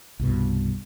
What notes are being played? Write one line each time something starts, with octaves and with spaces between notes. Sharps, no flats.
C2 G2 B2